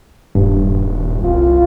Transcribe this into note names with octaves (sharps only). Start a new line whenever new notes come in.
D#1 G2
C2 F4